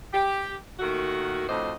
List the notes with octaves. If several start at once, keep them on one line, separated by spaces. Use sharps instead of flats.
G4
A#2 D#3 A3 F#4
F2 A2 D4 F#4 C5 D#5